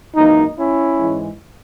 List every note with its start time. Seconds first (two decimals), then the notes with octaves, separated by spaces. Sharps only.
0.15 G#1 F#2 E3 A#3 D#4
0.57 C#4 E4
0.99 G#2 E3 G#3